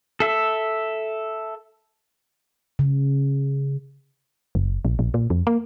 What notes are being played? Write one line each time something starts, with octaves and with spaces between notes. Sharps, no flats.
A4 E5
C#3
F#1
A#1
A#1
A#2
F2
A#3